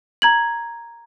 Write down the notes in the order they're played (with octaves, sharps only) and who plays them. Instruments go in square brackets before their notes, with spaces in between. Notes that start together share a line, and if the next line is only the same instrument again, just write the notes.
[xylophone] A#5 G#6 F#7